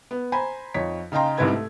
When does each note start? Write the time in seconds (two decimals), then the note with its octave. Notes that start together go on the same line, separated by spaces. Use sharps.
0.11 B3
0.32 C5 G#5 A#5 B5
0.74 F2 D#4 C#5 B6
1.12 C#3 D#4 F5 G5 A#5 C6
1.38 C2 G#2 C3 E4 B4 G#6
1.53 A3